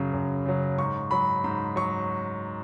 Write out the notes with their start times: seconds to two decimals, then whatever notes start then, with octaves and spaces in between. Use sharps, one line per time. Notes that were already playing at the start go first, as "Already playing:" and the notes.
Already playing: F#2 C#3 F#3
0.13 F#2
0.46 C#3 F#3
0.78 G#2 C#6
1.11 F#3 B5
1.44 G#2 B5
1.76 F#3 C#6